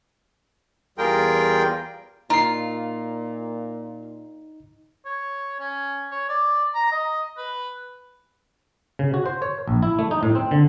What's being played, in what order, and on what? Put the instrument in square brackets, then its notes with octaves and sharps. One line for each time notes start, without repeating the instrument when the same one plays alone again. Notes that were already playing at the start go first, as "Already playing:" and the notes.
[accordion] E2 G3 F4 G#4 A#4 G5
[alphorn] A#2 [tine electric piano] D#4 C7 [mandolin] F4 [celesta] A#5
[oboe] C#5
C#4
C#5
D5
A#5
D#5
B4
[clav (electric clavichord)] C#3
F#4
C5
C#5
A#1
E4
A3
D#4
A2
C4
D3